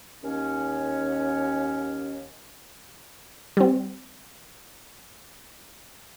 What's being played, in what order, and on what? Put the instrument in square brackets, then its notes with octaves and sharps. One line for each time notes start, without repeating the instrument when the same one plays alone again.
[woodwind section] D#2 C#4
[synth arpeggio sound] G3 C4